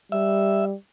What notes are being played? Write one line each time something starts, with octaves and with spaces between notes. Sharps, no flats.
G3 E5